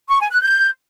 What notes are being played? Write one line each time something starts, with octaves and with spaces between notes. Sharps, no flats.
C#6
G#5
F#6
G6